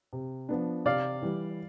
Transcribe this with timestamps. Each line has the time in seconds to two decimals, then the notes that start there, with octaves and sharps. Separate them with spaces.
0.13 C3
0.49 F3 B3 D4
0.85 C3 D5 F5
1.22 E3 G3